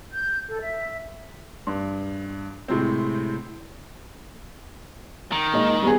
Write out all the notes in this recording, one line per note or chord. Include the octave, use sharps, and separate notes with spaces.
G6
A4
E5
G2
A2 C3 G#3 C4
D#3
A#2 G#3 D#4
G3 B3 G#4